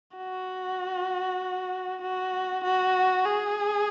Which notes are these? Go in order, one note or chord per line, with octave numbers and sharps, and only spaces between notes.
F#4
F#4
F#4
G#4